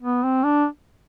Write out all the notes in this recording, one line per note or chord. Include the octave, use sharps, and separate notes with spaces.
B3
C4
D4